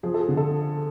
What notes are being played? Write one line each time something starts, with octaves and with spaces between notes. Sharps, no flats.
F3 G#4
A4
G#4
D3
A4